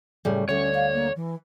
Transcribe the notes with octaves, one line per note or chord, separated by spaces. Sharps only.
A2 C#3 G3
D2 D3 C#4 C#5
F5
A#3
E3